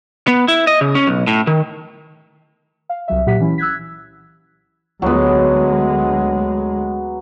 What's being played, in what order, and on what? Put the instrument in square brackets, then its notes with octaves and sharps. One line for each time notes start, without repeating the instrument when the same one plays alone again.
[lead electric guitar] B3
E4
D#5
C#3
C#4
B1
A2
D#3
[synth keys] F5
C2 F#3 E5
A#2 F#3 G4 F#5 B6
E3 C#4 E4
E6 F#6 G#6 B6
[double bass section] D2 G#3 [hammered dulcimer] F#3 B3